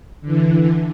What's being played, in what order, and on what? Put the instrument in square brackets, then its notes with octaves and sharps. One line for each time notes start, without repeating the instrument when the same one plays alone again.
[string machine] D3 E3